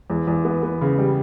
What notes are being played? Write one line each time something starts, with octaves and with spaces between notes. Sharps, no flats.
E2
E2
B3
B3
C#3
G3